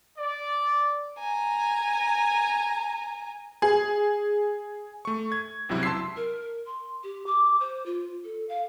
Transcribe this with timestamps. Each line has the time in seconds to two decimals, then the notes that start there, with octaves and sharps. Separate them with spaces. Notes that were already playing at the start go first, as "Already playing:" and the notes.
0.18 D5
1.20 G#5 A#5
3.62 G#4
5.05 A3 C#6
5.32 G#6
5.69 G1 C#2 C3 F#3 E4
5.83 A5 C6 E6 B6 C7
6.16 A#4
6.66 C6
7.03 G4
7.26 D6
7.60 C5
7.85 F4
8.24 A4
8.48 F5